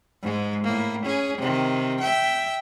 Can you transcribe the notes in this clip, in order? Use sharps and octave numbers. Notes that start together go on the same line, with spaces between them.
G#2 G#3
A2 A#3
C#4 G#4
C3 D#3
E5 G5